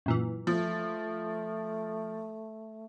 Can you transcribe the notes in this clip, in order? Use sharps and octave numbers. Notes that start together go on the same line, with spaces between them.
F#2 A#2 E3
F3 A3